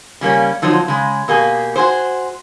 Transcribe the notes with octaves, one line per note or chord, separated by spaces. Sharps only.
C#3 G3 A#3 C#4
D3 F3 F#3 C4 D#4
C#3 G#3
B2 A#3 G4 G#4
F#4 G#4 C5